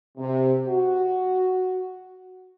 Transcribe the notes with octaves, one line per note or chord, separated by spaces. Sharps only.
C3
F#4